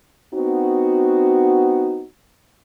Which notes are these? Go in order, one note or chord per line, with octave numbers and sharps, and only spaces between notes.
B3 C4 D#4 F#4